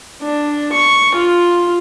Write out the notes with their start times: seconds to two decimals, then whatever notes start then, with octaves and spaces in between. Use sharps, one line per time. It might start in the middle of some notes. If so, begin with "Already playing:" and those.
0.22 D4
0.72 C#6
1.15 F4